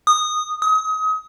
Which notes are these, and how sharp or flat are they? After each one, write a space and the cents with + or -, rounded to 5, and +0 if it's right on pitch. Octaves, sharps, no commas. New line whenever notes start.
D#6 -10
D#6 +30